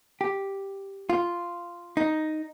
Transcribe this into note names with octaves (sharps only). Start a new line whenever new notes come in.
G4
F4
D#4